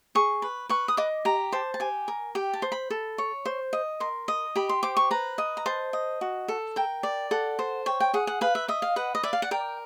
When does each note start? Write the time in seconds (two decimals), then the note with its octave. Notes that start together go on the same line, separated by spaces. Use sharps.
0.15 G#4 C#6
0.42 B4
0.69 B4 C#6
0.88 D#6
0.97 D#5 D6
1.25 G4 A#5
1.52 C5 A5
1.74 A5
1.80 G4 G#5
2.08 A#4
2.35 G4 G5
2.54 A5
2.62 C5
2.72 B5
2.90 A4
3.18 C#5
3.46 C5
3.73 D#5
4.00 A#4 C6
4.28 D#5
4.56 G4 B5
4.69 C6
4.83 C5 D6
4.97 C#6
5.11 B4 A#5
5.38 D#5
5.57 A#5
5.66 C5 A5
5.93 D#5
6.21 F#4
6.48 A4
6.76 A#4 G5
7.03 D5
7.31 A4 F#5
7.59 C5
7.86 C#5 G5
8.00 G5
8.14 G#4 F#5
8.27 F#5
8.41 B4 F5
8.55 E5
8.68 D#5 E5
8.82 F5
8.96 B4 F#5
9.15 D#5
9.23 D5 E5
9.33 F5
9.42 F#5
9.51 A#4 G5